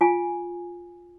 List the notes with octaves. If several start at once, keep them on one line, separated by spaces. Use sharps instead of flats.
F4 G#5